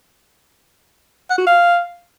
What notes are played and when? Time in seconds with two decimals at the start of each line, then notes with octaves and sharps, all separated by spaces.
1.30 F#5
1.38 F#4
1.47 F5